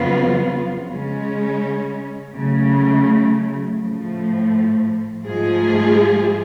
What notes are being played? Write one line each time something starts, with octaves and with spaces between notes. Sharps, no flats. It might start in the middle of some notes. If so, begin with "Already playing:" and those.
Already playing: F2 C#3 F#3 B3 F4
C#3 G#3 C#4
C#3 F#3 A3
A2 F3 A3
G#2 F3 A3 F4 G#4